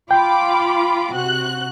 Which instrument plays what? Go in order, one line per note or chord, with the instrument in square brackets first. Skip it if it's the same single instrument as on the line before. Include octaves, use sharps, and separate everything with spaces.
[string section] F4 B5 D6 [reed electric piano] G5
[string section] C3 F#4 F#6